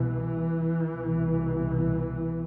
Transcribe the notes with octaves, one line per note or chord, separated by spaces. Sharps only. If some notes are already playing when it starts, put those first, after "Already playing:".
Already playing: C2 B2 E3
C2 B2